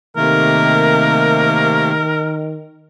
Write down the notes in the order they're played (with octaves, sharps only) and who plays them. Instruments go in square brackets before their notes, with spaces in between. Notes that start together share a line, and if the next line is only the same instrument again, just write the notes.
[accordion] C3 A3 A#3 [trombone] D#3 [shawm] A#4